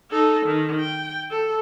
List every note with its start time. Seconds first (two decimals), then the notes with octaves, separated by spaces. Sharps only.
0.11 D#4 A4
0.46 D#3
0.80 G5
1.31 A4